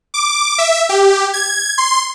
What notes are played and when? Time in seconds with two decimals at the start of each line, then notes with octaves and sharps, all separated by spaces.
0.14 D6
0.58 E5
0.89 G4
1.34 G#6
1.78 C6